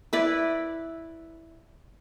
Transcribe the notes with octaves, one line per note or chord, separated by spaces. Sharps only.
E4 B4 D5